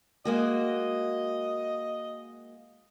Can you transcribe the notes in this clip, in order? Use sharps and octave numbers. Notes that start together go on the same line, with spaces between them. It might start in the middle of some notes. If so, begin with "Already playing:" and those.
G#3 A#3 F#4 D#5